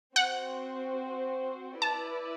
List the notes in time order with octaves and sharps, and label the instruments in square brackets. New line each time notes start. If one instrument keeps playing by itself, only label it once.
[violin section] C4 F#4 C5 [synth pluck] F#5
[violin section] E4 B4 D5 [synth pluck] A5